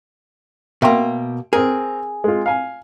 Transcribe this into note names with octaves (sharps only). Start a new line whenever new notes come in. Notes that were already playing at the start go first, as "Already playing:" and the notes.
B2 A#3 E5 G5 C6
C4 G#4 A#4
G#3 F4
F5 G#5